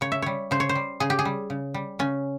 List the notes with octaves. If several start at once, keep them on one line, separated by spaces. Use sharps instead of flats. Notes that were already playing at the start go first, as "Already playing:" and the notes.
C#3 C#5
E5
G3 C#5
C#3 C5
C#5
C5
G3
C#3 G#4
G4
G#4
G3
C#3
G3
C#3 C#4